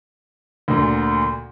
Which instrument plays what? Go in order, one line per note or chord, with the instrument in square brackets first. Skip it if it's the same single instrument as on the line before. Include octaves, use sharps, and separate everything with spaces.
[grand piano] D2 A#2